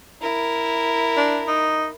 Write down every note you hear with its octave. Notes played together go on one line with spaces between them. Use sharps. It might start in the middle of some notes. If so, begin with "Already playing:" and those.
E4 A#4
D4
D#4